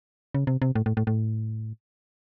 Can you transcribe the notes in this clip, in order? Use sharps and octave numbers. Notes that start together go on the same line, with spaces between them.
C#3
C3
C3
A2
A2
A2
A2